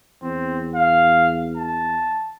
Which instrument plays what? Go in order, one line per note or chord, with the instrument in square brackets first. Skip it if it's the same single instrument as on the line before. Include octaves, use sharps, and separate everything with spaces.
[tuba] E2 [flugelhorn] C4
[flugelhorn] F5
A5